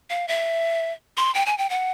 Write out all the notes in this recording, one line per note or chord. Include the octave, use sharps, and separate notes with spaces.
F5
E5
C6
G5
G#5
G5
F#5